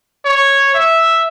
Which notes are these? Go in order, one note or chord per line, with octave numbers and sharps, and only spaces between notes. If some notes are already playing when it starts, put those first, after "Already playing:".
C#5
E5